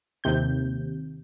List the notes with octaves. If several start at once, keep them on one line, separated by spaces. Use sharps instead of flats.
D#2 C3 G6